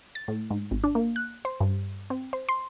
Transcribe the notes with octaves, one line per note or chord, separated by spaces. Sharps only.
A6
A2
G#2
G#1
D4
A#3
F#6
C5
G2
C4
C5
C6